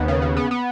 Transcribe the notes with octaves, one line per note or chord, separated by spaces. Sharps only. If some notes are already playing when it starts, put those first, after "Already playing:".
Already playing: D#2 B3
C#3
C#3
B3
B3